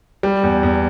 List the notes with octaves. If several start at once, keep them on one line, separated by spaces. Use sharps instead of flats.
G3
E2
E2